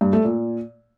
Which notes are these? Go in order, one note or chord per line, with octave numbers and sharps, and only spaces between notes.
G2
A3
A#2